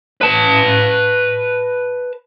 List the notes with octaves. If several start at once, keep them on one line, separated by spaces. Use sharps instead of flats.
B4 A5